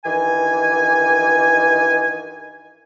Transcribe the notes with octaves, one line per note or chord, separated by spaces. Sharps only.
G2 D#3 E3 G#5